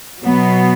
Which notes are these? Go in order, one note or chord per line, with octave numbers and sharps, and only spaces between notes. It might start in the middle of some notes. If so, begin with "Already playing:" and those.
B2 F#3 B3